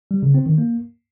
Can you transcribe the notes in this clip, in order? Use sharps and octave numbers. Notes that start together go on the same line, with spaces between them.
G3
C#3
C4
D#3
A#3